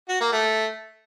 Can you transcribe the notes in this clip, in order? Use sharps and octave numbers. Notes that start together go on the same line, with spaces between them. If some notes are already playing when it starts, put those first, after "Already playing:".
F#4
A#3
A3